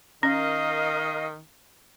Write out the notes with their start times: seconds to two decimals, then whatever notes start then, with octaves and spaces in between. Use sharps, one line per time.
0.23 D#3 C#4 A#4 D#5 F5